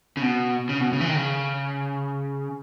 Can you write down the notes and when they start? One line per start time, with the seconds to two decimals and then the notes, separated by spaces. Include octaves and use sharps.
0.17 C#3
0.22 B2
0.69 C#3
0.81 B2
0.93 C#3
1.01 E3
1.09 D#3
1.16 C#3